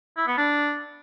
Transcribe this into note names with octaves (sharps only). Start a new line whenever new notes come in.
E4
B3
D4